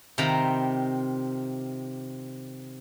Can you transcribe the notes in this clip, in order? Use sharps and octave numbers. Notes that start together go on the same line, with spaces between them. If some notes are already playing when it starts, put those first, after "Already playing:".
C3 D#3 F4 G5 A#5 B5